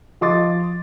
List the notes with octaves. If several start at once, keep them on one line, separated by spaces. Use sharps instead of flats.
F3 D#5 C6 D6 A6